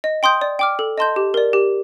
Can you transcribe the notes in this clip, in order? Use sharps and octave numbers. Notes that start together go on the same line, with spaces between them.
D#5
G5 C6 D#6 G6
D5
G5 D6 F6
A4
D#5 A5 C6 G6
G4
A#4 D5
G4